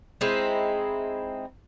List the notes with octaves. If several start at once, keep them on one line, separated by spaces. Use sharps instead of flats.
G#3 C4 D#4 E4